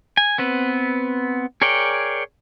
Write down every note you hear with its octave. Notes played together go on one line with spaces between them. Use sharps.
G#5
B3 C4 B4
G#4 A#4 C#5 D5 G5